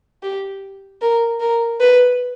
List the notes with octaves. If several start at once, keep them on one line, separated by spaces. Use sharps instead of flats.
G4
A#4
A#4
B4